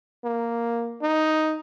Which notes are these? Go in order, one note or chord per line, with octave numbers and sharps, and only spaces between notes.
A#3
D#4